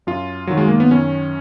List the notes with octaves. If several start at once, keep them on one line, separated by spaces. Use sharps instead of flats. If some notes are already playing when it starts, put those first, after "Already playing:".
F#2 F4
D#3 F#3
G#3
A#3
B3
F#2 C#4